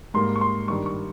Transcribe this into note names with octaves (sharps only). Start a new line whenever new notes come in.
G#2 G3 A#3 C6
C#6
C6
G2 D#3 G3 C#6
C#6